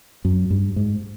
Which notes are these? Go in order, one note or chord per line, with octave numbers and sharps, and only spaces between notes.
F#2
G2
G#2